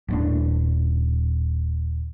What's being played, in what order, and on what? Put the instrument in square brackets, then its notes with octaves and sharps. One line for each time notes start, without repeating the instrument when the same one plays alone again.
[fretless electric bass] D#1 A2 D4